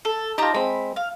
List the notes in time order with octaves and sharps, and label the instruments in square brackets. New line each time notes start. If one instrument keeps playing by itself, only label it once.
[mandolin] A4
[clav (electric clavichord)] D#4 F4 [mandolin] G4 A5 A#5
[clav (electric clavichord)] G#3 C4 [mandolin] B5
[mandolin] F5